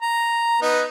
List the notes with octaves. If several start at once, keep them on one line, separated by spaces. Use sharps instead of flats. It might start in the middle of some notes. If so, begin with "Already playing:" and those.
A#5
B3 D#4